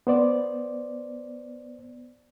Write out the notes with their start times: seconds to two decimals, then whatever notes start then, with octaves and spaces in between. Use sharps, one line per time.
0.07 B3 C5 D5